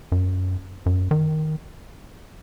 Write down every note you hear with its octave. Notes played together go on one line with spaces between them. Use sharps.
F#2
F#2
D#3